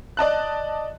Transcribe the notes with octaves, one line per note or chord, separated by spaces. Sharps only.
D5 D#5 A5 F#6